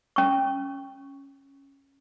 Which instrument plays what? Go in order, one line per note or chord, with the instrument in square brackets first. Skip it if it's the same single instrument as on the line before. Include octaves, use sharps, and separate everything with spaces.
[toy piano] C#4 C#6